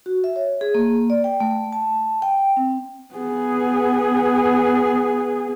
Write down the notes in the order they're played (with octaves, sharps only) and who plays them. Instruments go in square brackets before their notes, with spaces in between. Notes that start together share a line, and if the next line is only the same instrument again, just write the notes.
[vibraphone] F#4
E5
C#5
G#4
A#3
D5
G5
A3
A5
G5
C4
[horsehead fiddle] B3 G#4